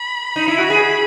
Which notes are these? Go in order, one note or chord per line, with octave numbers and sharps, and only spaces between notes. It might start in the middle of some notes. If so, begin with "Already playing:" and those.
Already playing: B5
D#4
E4
F#4
G#4